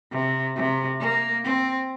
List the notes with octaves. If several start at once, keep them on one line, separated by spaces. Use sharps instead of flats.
C3
C3
A#3
C4